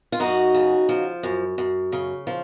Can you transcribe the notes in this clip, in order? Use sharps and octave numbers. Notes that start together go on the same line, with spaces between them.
F4
F#2 D#4 F#4
C#3
F3
F#2
F#2
C#3
F3